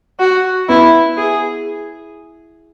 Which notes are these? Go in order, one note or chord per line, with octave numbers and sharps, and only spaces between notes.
F#4
B3 E4
G#4